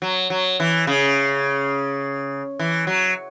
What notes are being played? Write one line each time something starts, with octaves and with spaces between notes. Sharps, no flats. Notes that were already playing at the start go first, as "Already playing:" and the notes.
F#3
F#3
E3
C#3
E3
F#3